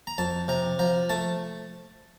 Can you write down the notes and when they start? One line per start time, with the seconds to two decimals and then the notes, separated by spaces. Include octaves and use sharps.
0.07 A#5
0.18 F2 A5
0.48 C3 A#5
0.79 F3 A#5
1.09 A3 A5